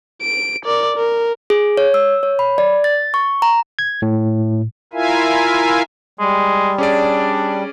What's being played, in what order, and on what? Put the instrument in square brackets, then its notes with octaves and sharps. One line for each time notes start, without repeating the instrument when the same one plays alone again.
[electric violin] D7
A#4 D5
A#4
[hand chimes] G#4
C#5
E6
C#5
B5
D5
A6
C#6
A#5
[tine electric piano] G#6
A2
[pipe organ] E4 F4 A#4 E5 F5 G#5
[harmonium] G3 [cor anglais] G#3
[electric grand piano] C#4 G#4 D5 [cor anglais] D4